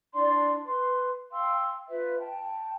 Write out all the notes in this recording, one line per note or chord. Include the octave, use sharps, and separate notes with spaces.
D4 E4 D5 C6
B4 C6
F5 G5 C6 E6
F4 B4 E5
G5 A5